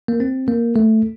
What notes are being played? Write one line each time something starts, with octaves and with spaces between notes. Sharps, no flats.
A#3
C4
A#3
A3